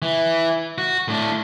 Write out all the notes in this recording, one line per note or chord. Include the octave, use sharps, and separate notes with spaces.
E3
F#4
A2 D4